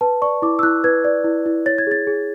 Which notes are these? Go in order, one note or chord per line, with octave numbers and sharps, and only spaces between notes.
B4 A5
D5 C#6
E4 D6
E6
E4 F#6
B4 G#6
D5
E4
E4
C#5 A6
G#6
G#4 A6
G#4